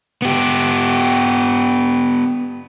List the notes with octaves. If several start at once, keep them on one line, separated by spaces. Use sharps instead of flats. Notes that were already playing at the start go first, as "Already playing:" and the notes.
B3 G4